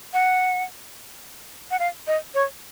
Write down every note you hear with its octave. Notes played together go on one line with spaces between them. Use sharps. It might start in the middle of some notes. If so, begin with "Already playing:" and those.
F#5
F#5
F5
D#5
C#5